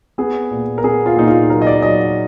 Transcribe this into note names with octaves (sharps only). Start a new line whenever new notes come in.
B3 G#4
A#2
A#4
B3 G#4
F4
A#2 D#4
F4
F#3 A#4
D#5
D5
F#3 D#5